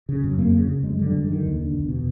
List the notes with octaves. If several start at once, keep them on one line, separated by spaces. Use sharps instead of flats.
C#3
F#2
F2 A#3
C#3
C#3
F#2 G#3
D3
G3
F#2
D3 D#3
D#2
D3
E2
B2